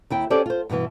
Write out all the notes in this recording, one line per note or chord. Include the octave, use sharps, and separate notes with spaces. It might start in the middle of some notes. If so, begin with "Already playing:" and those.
D#2 E4 G5
C#4 G4 A4 C5 D5
F4 C5
G2 B2 D3 E3 B3